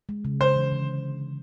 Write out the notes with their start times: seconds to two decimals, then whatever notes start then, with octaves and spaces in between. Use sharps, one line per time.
0.09 G#3
0.25 C#3
0.41 C#3 C5
0.56 E3
0.72 D3